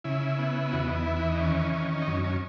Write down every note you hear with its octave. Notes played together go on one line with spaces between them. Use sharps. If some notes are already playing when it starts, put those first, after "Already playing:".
C#3 E4
B3
E2 F#4
E4
D#4
E4
E3
E4
D#4
D#3 C#4
D#3
D#4
F#2 C#4
C#4